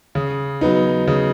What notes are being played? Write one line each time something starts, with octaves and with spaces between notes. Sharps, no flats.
C#3
F#3 B3 D#4
C#3